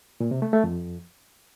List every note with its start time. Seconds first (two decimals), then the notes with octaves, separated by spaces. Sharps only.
0.20 A#2
0.31 C3
0.42 A3
0.53 A3
0.64 F2